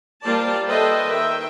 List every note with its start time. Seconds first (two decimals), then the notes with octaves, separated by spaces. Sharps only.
0.24 G3 A#3 F4 C5 D5 A5
0.66 A4 B4 C5 D#5 E5 G5
1.06 D#3 E5 G5